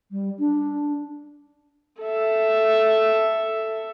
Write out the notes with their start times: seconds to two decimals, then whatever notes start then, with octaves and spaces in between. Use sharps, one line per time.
0.11 G3
0.39 D4
2.02 A4 E5